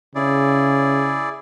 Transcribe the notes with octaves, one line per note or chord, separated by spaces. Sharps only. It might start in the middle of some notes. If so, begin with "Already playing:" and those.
C#3 E4 G#4 D5